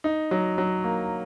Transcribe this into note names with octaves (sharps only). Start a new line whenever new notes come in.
D#4
F#3
F#3
A#3